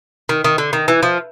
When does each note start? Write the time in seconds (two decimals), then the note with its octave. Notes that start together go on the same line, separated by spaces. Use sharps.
0.29 D#3
0.44 D#3
0.58 D3
0.73 D#3
0.88 E3
1.03 F3